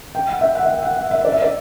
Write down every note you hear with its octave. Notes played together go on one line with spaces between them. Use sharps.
G5
F#5
E5
F#5
E5
F#5
F#5
F#5
E5
D5
E5
D5